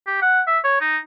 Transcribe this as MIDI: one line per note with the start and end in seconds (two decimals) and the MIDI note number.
0.07 0.18 67
0.22 0.41 78
0.47 0.59 76
0.64 0.79 73
0.81 0.97 63